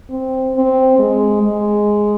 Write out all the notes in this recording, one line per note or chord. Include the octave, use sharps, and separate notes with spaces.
C4
C4
G#3
G#3